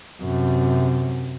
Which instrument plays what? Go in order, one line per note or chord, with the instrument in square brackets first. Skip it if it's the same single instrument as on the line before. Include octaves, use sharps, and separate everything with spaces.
[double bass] F#2 C3